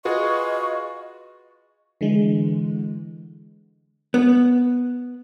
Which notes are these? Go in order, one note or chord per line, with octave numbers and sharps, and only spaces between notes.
F4 F#4 G#4 B4 D#5 C#6
D3 E3 G#3
B3